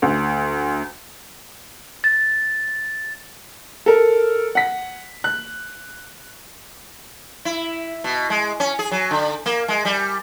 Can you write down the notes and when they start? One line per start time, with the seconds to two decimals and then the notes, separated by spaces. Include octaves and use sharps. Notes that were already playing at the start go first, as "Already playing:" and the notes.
0.02 D2
2.04 A6
3.86 A4 A#4
4.55 F#5 B6
5.24 F#6
7.45 E4
8.04 B2
8.30 G#3
8.60 C#4
8.79 G#4
8.91 F#3
9.11 D3
9.46 A#3
9.68 G#3
9.85 G3